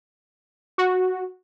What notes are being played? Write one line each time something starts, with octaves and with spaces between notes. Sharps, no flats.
F#4